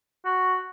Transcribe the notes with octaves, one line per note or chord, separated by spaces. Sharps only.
F#4